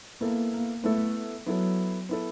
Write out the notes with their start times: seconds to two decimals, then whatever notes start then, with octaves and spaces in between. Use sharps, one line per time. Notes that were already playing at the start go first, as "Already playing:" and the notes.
0.21 A#3 B3 E4 A4
0.52 A#3
0.83 A3 B3 E4 A4
1.46 F#3 B3 E4 A4
2.09 B3 E4 A4